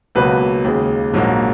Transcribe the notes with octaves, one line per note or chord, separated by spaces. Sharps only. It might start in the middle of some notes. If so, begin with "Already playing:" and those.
C#2 B2 F#3 A#3 B4
D#2 C#3 G#3
A#1 G#2 F#3 A#3